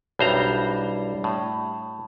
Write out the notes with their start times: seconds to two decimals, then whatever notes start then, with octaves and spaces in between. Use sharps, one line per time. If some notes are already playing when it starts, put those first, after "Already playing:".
0.19 B1 G3 D4 E4 C5 A#5
1.24 A2